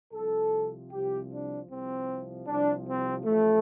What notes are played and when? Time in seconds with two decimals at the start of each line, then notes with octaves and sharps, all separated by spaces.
0.13 C2 C3 F3 A4
0.91 C2 C3 F3 G4
1.30 D4
1.69 C2 C3 F3 C4
2.47 C2 C3 F3 D4
2.86 C4
3.25 A1 A2 F3 A3